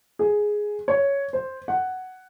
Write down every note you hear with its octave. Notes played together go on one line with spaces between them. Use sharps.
G#4
C#5
C5
F#5